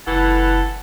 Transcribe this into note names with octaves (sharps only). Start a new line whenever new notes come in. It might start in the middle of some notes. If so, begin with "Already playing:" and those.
F#1 A2 E3 A4 F#5 A5